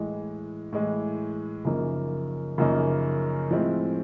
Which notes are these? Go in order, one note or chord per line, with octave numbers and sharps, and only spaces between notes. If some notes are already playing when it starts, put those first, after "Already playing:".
Already playing: A2 E3 G#3
A2 E3 G#3
F#2 C#3 F3 A#3 D#4
F#2 C#3 F3 A#3 D#4
A2 F3 G#3 C4 E4